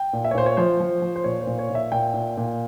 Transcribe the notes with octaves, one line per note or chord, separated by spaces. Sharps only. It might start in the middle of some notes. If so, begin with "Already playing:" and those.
Already playing: G5
A#2
E5
C#5
A#2 C5
C#5
F3 C5
F3
F3
C5
A#2 C#5
C5
A#2
C#5
A#2
E5
A#2 G5
A#2
A#2